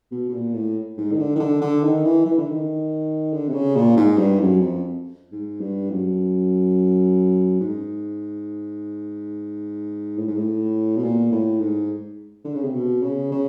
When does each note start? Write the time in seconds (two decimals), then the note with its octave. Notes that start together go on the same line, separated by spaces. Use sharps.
0.11 B2
0.29 B2
0.34 A#2
0.55 A2
0.98 G#2
1.13 D#3
1.19 D3
1.35 D#3
1.40 D3
1.61 D3
1.84 D#3
2.05 E3
2.26 E3
2.38 D3
2.47 D#3
3.33 D3
3.48 C3
3.54 C#3
3.76 A#2
3.97 G#2
4.18 G2
4.40 F#2
4.61 F2
5.32 G#2
5.60 G2
5.90 F#2
7.61 G#2
10.17 A2
10.27 G#2
10.37 A2
10.97 B2
11.03 A#2
11.32 A2
11.60 G#2
12.45 D3
12.55 C#3
12.64 C3
12.74 B2
13.02 C#3
13.32 C#3